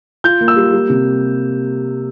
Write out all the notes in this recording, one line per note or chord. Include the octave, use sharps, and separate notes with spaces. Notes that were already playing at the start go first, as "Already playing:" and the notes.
F4 G6
A#3
E6
G3
G3
C3